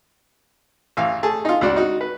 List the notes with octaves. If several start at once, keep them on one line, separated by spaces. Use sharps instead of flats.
A1 E3 F5
A3 G#4 A5
D#4 F4
C#2 D4 F#4 D5
D#4 F#4
B4